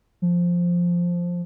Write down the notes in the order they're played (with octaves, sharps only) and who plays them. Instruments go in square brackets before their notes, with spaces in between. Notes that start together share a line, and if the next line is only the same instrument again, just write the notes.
[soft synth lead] F3